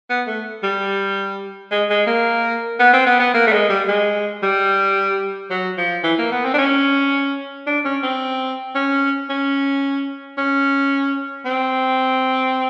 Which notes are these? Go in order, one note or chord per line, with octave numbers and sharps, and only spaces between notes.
B3
A3
G3
G#3
G#3
A#3
B3
C4
B3
B3
A#3
A3
G#3
G3
G#3
G3
F#3
F3
E3
A#3
B3
C4
D4
C#4
D4
C#4
C4
C#4
C#4
C#4
C4